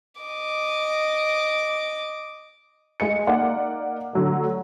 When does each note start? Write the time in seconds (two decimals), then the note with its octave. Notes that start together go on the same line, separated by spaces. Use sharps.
0.21 D#5 D6
3.00 G#3 D#5 C#7
3.27 A#3 D#4 D5 F#5
4.13 D3 F#3 A3